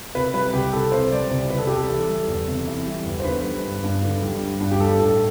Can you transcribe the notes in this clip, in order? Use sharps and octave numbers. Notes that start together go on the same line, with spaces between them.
C3 B4
G3 B4
C2 G4
C2 A4
C3 C5
G3 D5
C2
C2 B4
A4
C3 G4
A4
E3
G3
E2
C3
E3
G3
E2
C5
D3 B4
G3
G2
G2
D3
G3
G2
G2
G4
G3 A4
A2 A4